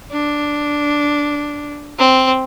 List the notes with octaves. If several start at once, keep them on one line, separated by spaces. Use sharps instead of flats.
D4
C4